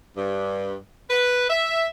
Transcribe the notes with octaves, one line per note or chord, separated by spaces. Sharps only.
G2
B4
E5